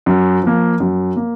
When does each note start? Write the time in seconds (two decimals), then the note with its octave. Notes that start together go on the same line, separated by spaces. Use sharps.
0.06 F#2
0.43 F3 A#3
0.80 F#2
1.16 A#3